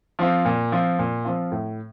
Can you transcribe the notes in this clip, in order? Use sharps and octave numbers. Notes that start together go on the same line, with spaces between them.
F3 C4 F4
A#2
F3 C4 F4
A#2
F3 C4 F4
A2